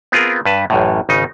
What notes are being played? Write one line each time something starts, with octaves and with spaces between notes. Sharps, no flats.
B3 C4 F4 G#4 A#4
G2 B4 A5
A1 F#2 A2
G#1 C#3 D#4